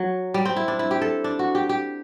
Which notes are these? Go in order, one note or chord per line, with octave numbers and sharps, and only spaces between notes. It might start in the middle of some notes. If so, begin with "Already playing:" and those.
Already playing: F#3
G3
C4
E4
D4
E4
G4
A4
D4
F#4
G4
G4